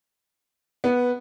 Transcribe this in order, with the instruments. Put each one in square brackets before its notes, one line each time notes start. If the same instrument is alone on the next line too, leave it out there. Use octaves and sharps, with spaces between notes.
[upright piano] B3